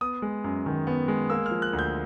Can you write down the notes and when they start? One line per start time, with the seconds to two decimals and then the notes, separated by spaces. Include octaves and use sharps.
0.01 B3 D#6
0.22 G#3
0.44 F#2
0.66 D#3
0.87 B3
1.08 G#3
1.30 A#3 E6
1.46 F6
1.51 F3
1.62 F#6
1.73 D2
1.79 G6